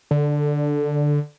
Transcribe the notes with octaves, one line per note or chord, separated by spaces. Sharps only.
D3